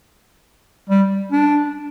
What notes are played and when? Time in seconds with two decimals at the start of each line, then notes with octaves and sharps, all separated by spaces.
0.89 G3
1.32 D4